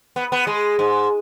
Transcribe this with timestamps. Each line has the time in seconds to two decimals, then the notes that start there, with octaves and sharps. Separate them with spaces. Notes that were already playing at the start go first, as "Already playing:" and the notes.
0.16 B3
0.32 B3
0.47 G#3
0.79 G#2